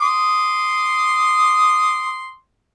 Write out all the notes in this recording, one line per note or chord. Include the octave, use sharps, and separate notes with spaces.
C6 D6 D#6